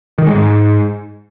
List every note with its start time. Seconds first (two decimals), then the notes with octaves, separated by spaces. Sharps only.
0.18 D#3
0.27 G#3
0.35 G#2